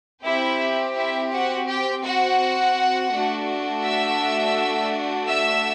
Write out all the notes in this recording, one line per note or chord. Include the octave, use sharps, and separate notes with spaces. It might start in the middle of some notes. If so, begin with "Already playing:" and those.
C4 E4 G4 E5
E4 E5
F#4 F#5
G4 G5
F#4 F#5
A3 D4 F#4
E5 E6
E5 E6